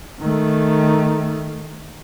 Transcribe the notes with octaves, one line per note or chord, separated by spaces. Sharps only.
D#3 A3